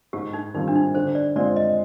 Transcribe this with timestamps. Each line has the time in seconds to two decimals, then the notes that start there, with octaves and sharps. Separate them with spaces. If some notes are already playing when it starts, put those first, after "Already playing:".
0.13 G#2 G4
0.33 D#4
0.54 D#3 G3 C4 D#4 F4
0.68 D4
0.75 D#4
0.95 D3 C5
1.15 D5
1.36 G#3 C4 F4 C5 D5
1.56 D#5